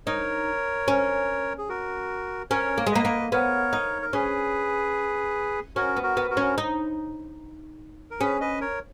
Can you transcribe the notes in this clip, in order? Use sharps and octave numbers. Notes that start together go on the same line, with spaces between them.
D#4 A#4 C#5
C#4
G#4
F#4 A#4
C#4 A#4 C#5
A#3
G#3
A#3 B4 D#5
A#3
B3 A#4 C#5
D#4
A#4
C#4 G#4 B4
C#4 F#4 A#4
B3
F#4 A#4
B3
F#4 A#4
C#4
D#4
A#4
C#4 G#4 B4
B4 D#5
A#4 C#5